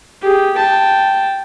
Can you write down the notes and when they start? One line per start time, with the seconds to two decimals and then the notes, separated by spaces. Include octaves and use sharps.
0.22 G4 G#4
0.57 G5 A5